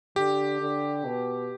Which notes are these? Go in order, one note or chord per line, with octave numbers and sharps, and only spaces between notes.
D3 G4
D3
B2